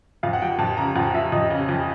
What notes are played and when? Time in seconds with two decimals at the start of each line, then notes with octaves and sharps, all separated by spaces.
0.23 F2 F5
0.33 F#5
0.42 F3 G5
0.59 F2 A5
0.77 C#3 A#5
0.96 F2 F#5
1.14 F3 E5
1.32 F2 D#5
1.50 C#3
1.69 F2